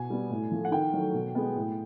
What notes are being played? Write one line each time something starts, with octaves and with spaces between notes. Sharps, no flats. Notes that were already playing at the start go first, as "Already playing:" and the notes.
Already playing: B2 G#5
G3 B3
A2
F3 A3
F#5
D#3 G5
F#3 A3
B2
G#3 B3
A2